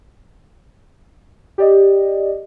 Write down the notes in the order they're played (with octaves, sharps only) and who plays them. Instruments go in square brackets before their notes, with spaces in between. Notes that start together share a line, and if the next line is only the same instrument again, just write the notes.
[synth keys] G4 D5 D#5